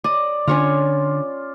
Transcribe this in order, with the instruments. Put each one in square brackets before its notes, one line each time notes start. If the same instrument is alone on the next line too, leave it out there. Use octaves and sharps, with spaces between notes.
[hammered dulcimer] D5 [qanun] D#5
[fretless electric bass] D3 [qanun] C#4 C#5 A#5 [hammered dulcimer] F4